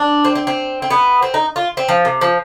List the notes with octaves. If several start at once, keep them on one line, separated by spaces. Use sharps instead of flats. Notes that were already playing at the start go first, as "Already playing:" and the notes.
Already playing: D4
C4
C4
C4
C4
B3
C4
D#4
F4
C4
F3
C3
F3